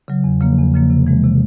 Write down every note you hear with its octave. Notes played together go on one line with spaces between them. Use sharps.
C#3 F#3
E2
C#3 F3 A#3
E2
C#3 F3 A#3
C3
E3 G#3
C3